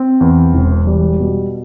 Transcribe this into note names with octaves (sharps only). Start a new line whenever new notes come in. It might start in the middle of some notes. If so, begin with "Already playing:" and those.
Already playing: C4
E2
E1
G3
B2